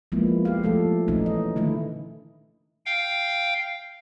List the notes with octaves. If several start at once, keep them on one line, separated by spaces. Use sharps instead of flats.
F3 G#3 A#3 B3 E4
G4 F5
F3 A3 A4
A#2 E3 A3 C#4 D#4
D#5
D3 D#3 A3 E4
F5 G5